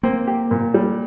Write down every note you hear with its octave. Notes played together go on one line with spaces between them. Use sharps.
A#3 C4
G4
A#2
G3